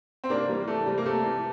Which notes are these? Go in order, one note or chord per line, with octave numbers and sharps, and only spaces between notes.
C4
C3 A#3 D4
E3 G3
E3 A3
C3 G3
A#3
C3 A3
E3